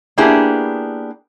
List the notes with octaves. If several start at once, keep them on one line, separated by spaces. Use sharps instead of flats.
A#3 B3 D4 E4 G4 G#4